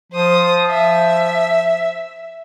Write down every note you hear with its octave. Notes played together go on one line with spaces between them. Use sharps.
F3 C5 D#6
E5